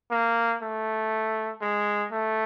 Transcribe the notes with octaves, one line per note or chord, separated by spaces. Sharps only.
A#3
A3
G#3
A3